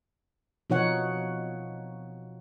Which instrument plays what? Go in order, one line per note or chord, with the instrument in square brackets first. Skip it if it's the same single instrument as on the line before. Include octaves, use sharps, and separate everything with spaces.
[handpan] B2 F3 D#4 C#5 F#5